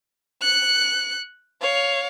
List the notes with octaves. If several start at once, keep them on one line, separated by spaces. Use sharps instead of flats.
F#6 C#7
C#5 F5